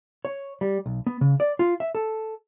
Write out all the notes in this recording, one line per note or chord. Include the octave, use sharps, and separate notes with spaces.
C#5
G3
B1
B3
C#3
D5
F4
E5
A4